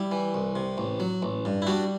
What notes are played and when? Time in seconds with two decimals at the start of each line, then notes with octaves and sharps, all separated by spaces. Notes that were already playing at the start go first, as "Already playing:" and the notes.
Already playing: G3 E4
0.12 E3
0.34 C2
0.56 C3
0.78 A1
1.00 F#3
1.23 A1
1.45 G2
1.62 E4
1.67 G3 D4 F#4